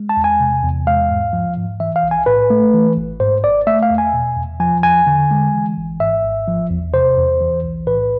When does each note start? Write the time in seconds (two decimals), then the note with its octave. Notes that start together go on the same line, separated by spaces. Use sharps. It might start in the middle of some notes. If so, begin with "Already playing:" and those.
Already playing: G#3
0.09 A5
0.17 E2
0.24 G#5
0.40 C3
0.63 E2
0.87 G#3 F5
1.10 G#2
1.33 F3
1.57 G#2
1.80 E3 E5
1.96 F5
2.03 B1
2.11 G#5
2.26 A2 B4
2.50 A3
2.74 E3
2.97 G#1
3.20 G#2 C5
3.44 G#1 D5
3.67 A3 E5
3.83 F5
3.90 E2
3.98 G#5
4.13 B2
4.37 E2
4.60 F3 G#5
4.83 E2 G#5
5.07 D3
5.31 G#3
5.54 E3
5.77 G#1
6.00 G#2 E5
6.24 G#1
6.47 F3
6.70 E2
6.94 C3 C5
7.17 E2
7.41 E3
7.64 B1
7.87 A2 B4